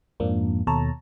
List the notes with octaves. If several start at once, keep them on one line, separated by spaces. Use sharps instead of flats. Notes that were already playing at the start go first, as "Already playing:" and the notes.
F2 G#2 F3 A#3 D4
D#2 B2 A4 C#5 A5 A#5